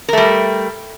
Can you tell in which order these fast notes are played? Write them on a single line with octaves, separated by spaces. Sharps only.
A#4 A3 G3